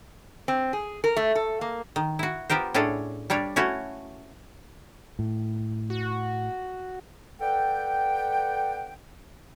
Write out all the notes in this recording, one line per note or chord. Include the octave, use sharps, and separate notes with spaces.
C4
G#4
A#4
A3
A4
A#3
D#3
E4 F#4
B3 F4 G4 A#4 C5
A2 C#4 D4 G#4 A4
G3 D4 C#5 F5
A3 C#4 E4 F#4
A2
F#4
A4 B4 D5 F#5 G5